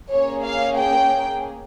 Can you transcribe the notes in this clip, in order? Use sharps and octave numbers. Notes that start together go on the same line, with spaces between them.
A#3 C#4 G#4 C#5
F5
G5